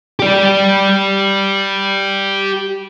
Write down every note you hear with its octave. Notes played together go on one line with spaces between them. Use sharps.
G4 D5